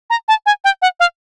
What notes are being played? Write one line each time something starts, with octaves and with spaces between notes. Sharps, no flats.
A#5
A5
G#5
G5
F#5
F5